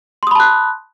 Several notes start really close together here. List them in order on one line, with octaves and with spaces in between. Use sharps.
C6 D#6 B5 A5 F#6